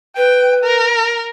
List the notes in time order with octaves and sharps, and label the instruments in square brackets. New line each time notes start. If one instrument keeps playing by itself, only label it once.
[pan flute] B4 [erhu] G5
[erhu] A#4